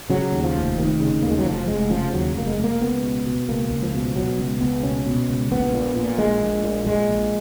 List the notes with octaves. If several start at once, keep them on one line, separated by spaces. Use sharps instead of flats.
C#3 F#3
D#2
F3
F1
F1 D#3
C#3
D#2 A#3
G#3
F#3
F1 F3
F1 G#3
C#3 F3
D#2 F#3
F1 A#3
G#3
F1
A#3
C#2 B3
B2
B2
C#2 A#3
C#2
F3
B2
B2 F#3
C#2
C#2 B3
B2 C#4
B2
C#2
A#1 B3
A#2
A#2
A#1 G#3
A#1
A#2
A#2 G#3
A#1